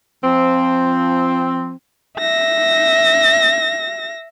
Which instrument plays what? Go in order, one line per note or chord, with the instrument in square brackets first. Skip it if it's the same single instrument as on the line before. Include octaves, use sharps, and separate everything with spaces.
[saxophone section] F3 C4
[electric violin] E5 A#6